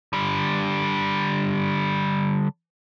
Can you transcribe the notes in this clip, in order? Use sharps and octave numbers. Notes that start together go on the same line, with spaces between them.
D3 G3